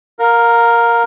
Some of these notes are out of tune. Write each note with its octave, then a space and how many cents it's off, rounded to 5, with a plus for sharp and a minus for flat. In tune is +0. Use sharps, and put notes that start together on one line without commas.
A#4 +0 F5 +25